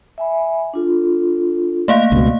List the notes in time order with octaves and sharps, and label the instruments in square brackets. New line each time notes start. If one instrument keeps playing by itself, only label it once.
[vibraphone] E5 G#5 B5
D4 F4 A4
[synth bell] A3 A#3 F5
[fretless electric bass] C#2 B2